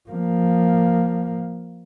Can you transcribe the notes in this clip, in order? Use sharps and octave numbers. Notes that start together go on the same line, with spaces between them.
F3 A#3